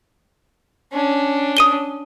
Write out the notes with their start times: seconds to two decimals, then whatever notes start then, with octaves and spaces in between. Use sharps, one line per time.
0.93 C#4 D4
1.57 D#6 D#7 G7